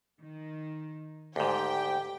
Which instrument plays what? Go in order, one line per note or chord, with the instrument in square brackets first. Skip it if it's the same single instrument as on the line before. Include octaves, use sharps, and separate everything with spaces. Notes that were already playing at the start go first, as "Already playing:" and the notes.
[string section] D#3
[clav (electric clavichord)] D2 G#2 [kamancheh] G4 [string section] G5